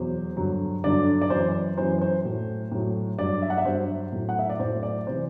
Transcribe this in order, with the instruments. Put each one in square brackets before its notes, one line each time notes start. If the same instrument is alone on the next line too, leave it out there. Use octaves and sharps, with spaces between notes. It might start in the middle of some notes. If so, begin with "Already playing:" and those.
Already playing: [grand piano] E2 B2 F#3 C5
G2 D3 F#3
G2 D3 F#3 D5
D5
F#2 E3 C5
F#2 E3 C5
C5
A2 F#3
A2 F#3
G2 F#3 D5
E5
F#5
E5
G2 F#3 C5
A2 F#3
F#5
E5
D5
A2 F#3 C5
D5
C3 E3 C5